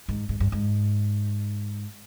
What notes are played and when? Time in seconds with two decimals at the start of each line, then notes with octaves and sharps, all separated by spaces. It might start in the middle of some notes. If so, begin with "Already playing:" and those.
0.08 G#2
0.29 G#2
0.40 G2
0.52 G#2